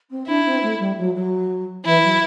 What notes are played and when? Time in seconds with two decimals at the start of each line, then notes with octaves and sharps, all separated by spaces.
0.10 C4
0.27 D4 E4
0.45 C4
0.62 A3
0.79 G3
0.97 F#3
1.15 F#3
1.85 E3 E4
2.03 F#3